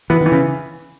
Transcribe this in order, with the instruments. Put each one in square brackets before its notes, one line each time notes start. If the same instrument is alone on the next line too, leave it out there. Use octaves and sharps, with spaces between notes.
[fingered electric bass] E3 [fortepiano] B3
[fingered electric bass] D#3
[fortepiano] E3
[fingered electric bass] C#3